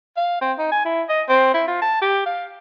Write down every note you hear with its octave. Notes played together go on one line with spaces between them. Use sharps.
F5
C4
D#4
G#5
E4
D#5
C4
E4
F4
A5
G4
F5